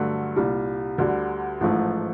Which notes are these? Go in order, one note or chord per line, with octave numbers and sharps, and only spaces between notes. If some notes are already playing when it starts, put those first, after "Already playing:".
Already playing: G2 D3 F#3 A3
C2 A#2 G3
D2 D3 G3
A1 G#2 F3 A3